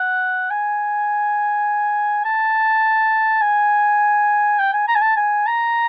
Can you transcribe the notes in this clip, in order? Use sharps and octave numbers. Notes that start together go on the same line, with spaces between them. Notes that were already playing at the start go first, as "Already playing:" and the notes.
Already playing: F#5
G#5
A5
G#5
G5
G#5
A#5
G#5
A5
G#5
A#5